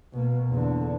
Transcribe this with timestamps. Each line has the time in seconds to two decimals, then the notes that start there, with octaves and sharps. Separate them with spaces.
0.13 B2 A#3
0.49 E2 D3